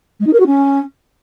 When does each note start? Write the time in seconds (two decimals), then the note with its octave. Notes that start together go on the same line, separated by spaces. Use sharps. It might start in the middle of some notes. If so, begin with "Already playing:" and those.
0.20 G#3
0.26 D#4
0.33 A#4
0.39 F#4
0.46 C#4